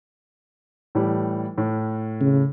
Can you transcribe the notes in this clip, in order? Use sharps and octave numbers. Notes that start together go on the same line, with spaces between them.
A2 E3 G3
A2
C#3